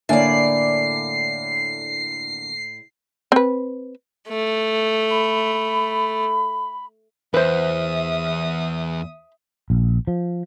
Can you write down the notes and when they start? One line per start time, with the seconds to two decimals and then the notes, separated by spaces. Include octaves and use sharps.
0.09 A2 D3 A#3 C#5 D5 E5 G#5 C7
3.32 C4 B4
4.28 A3
5.10 B5
7.34 E2 B4 C5 E5 D#6
9.70 A#1
10.07 F3